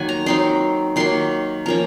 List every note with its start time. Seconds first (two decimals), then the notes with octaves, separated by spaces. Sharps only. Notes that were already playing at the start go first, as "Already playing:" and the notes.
Already playing: D#3 F#3 A#3 F#5 G#5
0.09 A#5
0.26 F#3 C4 D#4 C6
0.96 D#3 F#3 A#3 C6
1.66 F3 A#3 C#4 A#5